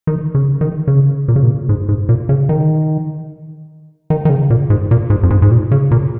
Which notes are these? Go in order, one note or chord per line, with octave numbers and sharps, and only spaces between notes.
D#3
C#3
D#3
C#3
A#2
C#3
A#2
G#2
G#2
A#2
C#3
D#3
D#3
D#3
C#3
A#2
G#2
A#2
G#2
F2
G#2
G#2
A#2
C#3
A#2